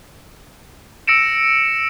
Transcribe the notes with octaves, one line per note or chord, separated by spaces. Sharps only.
E6 A#6 C#7 D7 E7